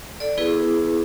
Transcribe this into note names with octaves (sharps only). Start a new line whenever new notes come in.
A4 D5
B3 E4 G#4 B4